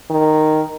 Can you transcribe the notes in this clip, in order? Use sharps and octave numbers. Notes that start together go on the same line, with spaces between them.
D#3